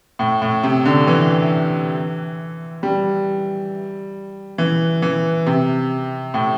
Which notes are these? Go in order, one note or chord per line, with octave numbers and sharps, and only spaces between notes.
A2
A2
C3
D3
E3
G3
E3
E3
C3
A2